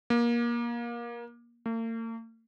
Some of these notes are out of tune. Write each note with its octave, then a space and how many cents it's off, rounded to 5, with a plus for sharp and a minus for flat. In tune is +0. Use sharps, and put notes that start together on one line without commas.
A#3 +25
A#3 -45